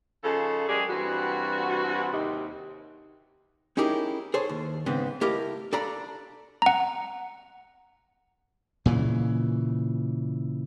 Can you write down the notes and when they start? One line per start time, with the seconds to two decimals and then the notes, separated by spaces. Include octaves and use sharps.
0.24 C#3 F3 D#4 G#4 A4
0.69 F#2 G#3 G4 G#4 A#4 D5
0.90 G2 E3 C4 F#4
2.12 D#2 C3 D#4
3.77 C#4 D#4 E4 G4 G#4 A#4
4.34 G#4 A4 C5 C#5
4.49 D#2
4.86 G#2 C#3 B3 C4
5.21 A3 E4 G4 A#4 D#5 F5
5.73 D4 A4 D5 F5 A#5 B5
6.62 F#5 A#5
8.86 A#2 C#3 E3